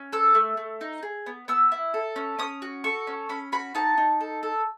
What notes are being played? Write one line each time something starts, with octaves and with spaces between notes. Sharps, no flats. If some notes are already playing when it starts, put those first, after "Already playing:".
Already playing: C#4
A4 E6
A3
A3
D#4
G#4
B3
B3 E6
E4
A4
C#4
C#4 D#6
F#4
A4 C#6
C#4
C#4 B5
F#4 B5
D#4 A5
D#4
A4
A4